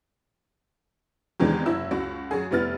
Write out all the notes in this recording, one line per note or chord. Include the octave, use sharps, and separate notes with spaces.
E2 C3 D#3 E3 G#3 D4
F#1 E4 E6
C#2 F#4
F#2 F#4 G#4
F1 G3 B3 E4 F6 A6